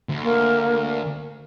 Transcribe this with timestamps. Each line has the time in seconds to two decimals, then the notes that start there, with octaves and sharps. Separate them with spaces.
0.09 D2
0.23 A#3